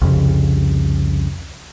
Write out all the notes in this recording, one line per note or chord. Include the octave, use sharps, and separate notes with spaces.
C2 F2 C#3